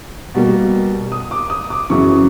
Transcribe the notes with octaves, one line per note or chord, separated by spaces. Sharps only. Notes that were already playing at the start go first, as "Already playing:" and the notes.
B2 G3 A#3
D#6
D6
D#6
D6
F#2 C#3 E3 C#6